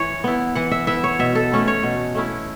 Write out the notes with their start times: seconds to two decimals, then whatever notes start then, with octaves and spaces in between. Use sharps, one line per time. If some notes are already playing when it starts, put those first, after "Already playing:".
Already playing: E3 C#5
0.24 B3 E4
0.55 E3 F#5
0.72 E5
0.87 B3 E4 E5
1.04 C#5
1.19 B2 E5
1.35 A4
1.52 A3 C#4 E4
1.68 C#5
1.83 B2
2.15 A3 C#4 E4